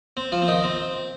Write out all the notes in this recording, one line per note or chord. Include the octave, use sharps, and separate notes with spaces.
C4
F3 F4
C4
D#3 D#4
C4